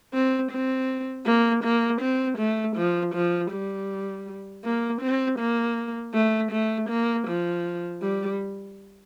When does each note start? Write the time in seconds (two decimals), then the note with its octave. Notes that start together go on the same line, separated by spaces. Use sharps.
0.13 C4
0.52 C4
1.26 A#3
1.64 A#3
2.01 C4
2.38 A3
2.77 F3
3.15 F3
3.52 G3
4.64 A#3
5.01 C4
5.39 A#3
6.14 A3
6.52 A3
6.90 A#3
7.27 F3
8.02 G3